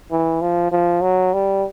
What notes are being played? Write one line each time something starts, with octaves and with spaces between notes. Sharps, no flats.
E3
F3
F3
F#3
G3